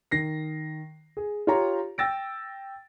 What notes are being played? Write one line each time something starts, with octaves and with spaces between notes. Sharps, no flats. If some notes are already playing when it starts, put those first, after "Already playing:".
D#3 A#6 C7
G#4
F4 G4 C#5 A#5
G5 E6 A6 A#6 D7